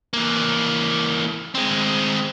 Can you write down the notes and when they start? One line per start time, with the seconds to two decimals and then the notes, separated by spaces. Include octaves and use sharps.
0.13 E3 A#3
1.55 G#3 C4